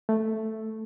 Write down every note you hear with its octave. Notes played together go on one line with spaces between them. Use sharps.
A3